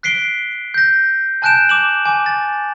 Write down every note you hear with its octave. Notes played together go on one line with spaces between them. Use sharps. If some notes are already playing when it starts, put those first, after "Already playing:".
F#6 B6 C7 D7 G7
G6 A#6
G#5 A5 F#6 G6 D7 E7
D6 E7 F#7
G#5 D6
A6